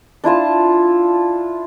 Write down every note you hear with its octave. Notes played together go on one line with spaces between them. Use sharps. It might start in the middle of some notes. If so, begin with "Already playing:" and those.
D4 E4 F4 A5